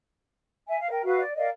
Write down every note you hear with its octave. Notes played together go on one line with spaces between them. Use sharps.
E5 G#5
F5
A#4 G5
F#4 B4 E5 F5
D5
A#4 D5 D#5 F5